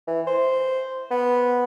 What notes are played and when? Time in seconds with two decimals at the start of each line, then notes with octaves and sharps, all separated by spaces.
0.07 E3
0.27 C5
1.11 B3